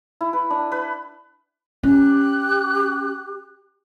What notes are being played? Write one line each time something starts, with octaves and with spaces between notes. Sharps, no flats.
E4
B4
D4
B4
C#4 G4 F#6